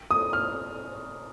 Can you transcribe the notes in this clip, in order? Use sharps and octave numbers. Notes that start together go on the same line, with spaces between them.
D#6
F6